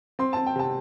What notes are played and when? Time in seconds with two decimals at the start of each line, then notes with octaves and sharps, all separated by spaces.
0.19 C4 C6
0.33 C4 A5
0.46 G5
0.56 C3 A5